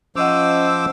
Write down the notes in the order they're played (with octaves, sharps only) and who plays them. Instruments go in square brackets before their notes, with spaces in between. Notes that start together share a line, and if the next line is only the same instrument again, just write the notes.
[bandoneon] F3 C5 D6 [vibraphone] C#4 D#5 F#5 [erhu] E6